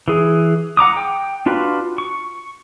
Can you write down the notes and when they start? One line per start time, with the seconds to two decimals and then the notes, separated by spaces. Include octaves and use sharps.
0.08 E3 G#4
0.77 F#5 A#5 D6 D#6
0.97 G5
1.46 D4 F4 F#4 B4
1.98 C#6